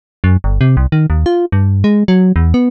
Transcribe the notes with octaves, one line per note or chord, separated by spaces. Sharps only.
F#2
G1
C3
C2
D#3
D#2
F4
G2
G#3
F#3
E2
B3